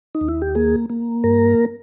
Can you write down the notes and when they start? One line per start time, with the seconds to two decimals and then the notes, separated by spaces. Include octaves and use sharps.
0.15 D#4
0.21 D#2
0.28 E4
0.42 G4
0.55 A#3 G#4
0.90 A#3
1.24 G2 A#4